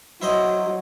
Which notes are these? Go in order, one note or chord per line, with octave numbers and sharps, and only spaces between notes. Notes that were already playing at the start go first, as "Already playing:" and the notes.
F#3 E4 C5 D#5